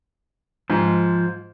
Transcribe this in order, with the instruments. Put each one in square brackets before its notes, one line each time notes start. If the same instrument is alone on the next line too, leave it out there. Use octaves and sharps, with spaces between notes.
[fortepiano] G#2 [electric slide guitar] F3